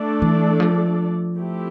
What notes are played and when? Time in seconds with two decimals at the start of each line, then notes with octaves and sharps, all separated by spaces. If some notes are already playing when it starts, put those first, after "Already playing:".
Already playing: A3 D4 A4 D5
0.22 E3
0.60 F3
1.37 A3 C4 E4 G4